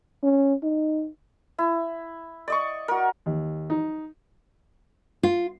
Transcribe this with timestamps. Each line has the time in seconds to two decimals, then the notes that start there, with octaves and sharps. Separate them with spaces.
0.24 C#4
0.63 D#4
1.59 E4
2.48 D5 D#5 C#6
2.88 F#4 A#4
3.26 D#2
3.70 D#4
5.23 F4